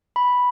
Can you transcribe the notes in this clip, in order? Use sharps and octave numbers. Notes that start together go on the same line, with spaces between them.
B5